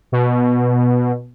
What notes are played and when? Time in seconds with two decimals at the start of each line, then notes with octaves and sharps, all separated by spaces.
0.12 B2